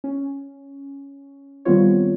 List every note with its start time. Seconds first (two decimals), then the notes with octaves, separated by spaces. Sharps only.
0.04 C#4
1.65 D#3 G3 B3 C4 F4 C#5